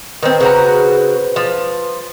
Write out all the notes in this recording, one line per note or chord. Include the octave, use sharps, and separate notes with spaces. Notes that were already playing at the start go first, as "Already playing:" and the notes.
D#3 C4 B4
C#3 F#4 B4 C5 A#5
F3